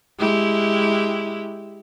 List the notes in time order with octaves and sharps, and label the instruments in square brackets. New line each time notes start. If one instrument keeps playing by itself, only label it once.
[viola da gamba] G#3 E4 G4